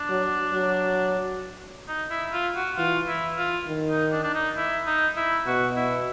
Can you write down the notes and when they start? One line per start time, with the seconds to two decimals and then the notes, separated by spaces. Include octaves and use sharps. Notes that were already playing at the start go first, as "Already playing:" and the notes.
Already playing: D4
0.09 F#3
0.53 F#3
1.88 D#4
2.10 E4
2.33 F4
2.56 F#4
2.77 E3 F4
3.07 E4
3.38 F4
3.67 D#3
3.90 D#4
4.12 D4
4.23 D4
4.34 D#4
4.57 E4
4.86 D#4
5.16 E4
5.47 B2 F#4
5.76 E4